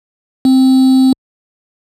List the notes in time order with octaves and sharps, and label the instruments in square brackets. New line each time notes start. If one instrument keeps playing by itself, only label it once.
[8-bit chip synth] C4